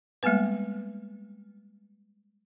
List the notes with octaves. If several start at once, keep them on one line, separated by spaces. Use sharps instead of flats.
G3 G#3 A#3 B3 B4